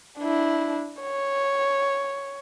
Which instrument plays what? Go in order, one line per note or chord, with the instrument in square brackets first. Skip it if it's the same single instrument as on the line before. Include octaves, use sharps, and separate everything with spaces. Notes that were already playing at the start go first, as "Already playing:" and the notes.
[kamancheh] D4 E4
C#5